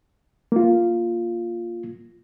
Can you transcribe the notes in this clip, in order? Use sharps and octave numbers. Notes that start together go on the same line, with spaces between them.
A#3 F4